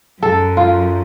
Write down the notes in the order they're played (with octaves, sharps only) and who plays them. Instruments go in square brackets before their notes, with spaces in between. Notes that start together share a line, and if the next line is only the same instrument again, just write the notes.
[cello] F#2 [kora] A4
[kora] F4